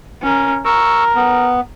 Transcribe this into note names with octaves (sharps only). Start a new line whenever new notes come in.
C#4 A#4
A#4 C#6 E6
B3